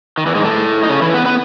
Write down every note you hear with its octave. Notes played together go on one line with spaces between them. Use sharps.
D#3
E2 E3
G#2 G#3
A2 A3
D#4
C#3 C#4
E3 E4
B3 B4
B3 B4